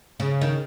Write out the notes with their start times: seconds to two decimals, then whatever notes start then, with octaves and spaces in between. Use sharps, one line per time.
0.20 C#3
0.41 D#3